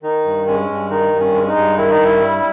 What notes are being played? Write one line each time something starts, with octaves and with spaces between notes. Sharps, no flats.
D#3 D#4
G2
G#3 C#4
G2
D#3 D#4
G2
C#4
G#3
C#4
D#4
G2
D#3 E4
D#4
G2 E4
G3